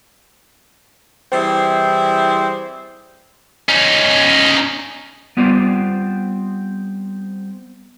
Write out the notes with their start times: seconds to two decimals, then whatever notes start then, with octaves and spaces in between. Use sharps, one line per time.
1.33 E3 G3 C4 E4 G#4 C5
3.69 C#4 D#4
5.37 G3 B3 C4 F4 D5